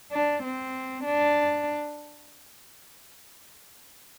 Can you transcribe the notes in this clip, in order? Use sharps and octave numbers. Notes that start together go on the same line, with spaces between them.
D4
C4
D4